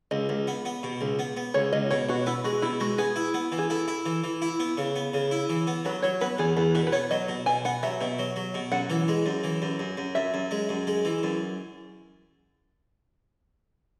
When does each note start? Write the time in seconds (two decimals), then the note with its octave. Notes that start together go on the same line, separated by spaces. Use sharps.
0.11 C#2 D#5
0.29 C#2
0.47 B3
0.65 B3
0.83 B2
1.01 C#2
1.19 B3
1.37 B3
1.54 C#2 C#5
1.73 C#2 D#5
1.91 B2 C#5
2.09 B2 F#4
2.26 B3 E4
2.44 G#3 F#4
2.62 B2 E4
2.80 G#3 F#4
2.98 B3 G#4
3.16 E4
3.34 B3
3.52 E3
3.58 G#4
3.70 E4 A4
3.88 E4
4.06 E3
4.24 E3
4.42 E4
4.60 B3
4.77 C#3
4.96 B3
5.14 C#3
5.31 E4
5.50 E3
5.67 B3
5.85 F#3 B4
6.02 F#3 C#5
6.21 B3 B4
6.39 E2 G#4
6.57 E2 B4
6.75 B2 B4
6.87 B4
6.92 B3 C#5
7.11 F#3 D#5
7.28 B2
7.46 B2 G#5
7.65 B3 F#5
7.83 F#3 E5
8.01 B2 E5
8.19 F#3
8.36 F#3
8.54 B2
8.72 F#2 F#5
8.90 E3
9.08 G#3
9.26 F#2
9.44 E3
9.62 F#2
9.79 F#2
9.97 F#2
10.15 F#2 E5
10.34 F#2
10.51 G#3
10.69 F#2
10.87 G#3
11.05 E3
11.23 F#2